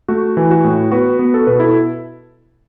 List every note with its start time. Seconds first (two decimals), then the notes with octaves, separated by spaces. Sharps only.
0.08 A3 F#4
0.37 E3
0.51 F#4
0.64 A2
0.92 B3 F#4 B4
1.19 B3
1.34 A4
1.47 B2 B4
1.59 E4 A4